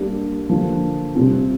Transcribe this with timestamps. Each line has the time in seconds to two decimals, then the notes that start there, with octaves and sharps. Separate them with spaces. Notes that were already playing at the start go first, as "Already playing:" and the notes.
Already playing: G3 A#3 D4
0.49 D3 F3 A#3
1.14 C3 G3 C4 F4